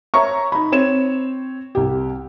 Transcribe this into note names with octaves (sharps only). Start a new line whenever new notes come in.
C#5 E5 A#5 C#6
D#4 B5
C4 C#5 E7
C2 G4